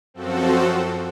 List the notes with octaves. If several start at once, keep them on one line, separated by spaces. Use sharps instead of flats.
F#2 F3 C4 F#4 A4